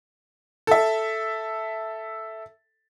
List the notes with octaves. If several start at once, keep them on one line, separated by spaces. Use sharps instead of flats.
A4 E5